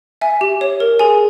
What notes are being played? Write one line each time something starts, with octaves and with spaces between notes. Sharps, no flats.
E5 G#5
G4
C#5
A#4
G#4 G#5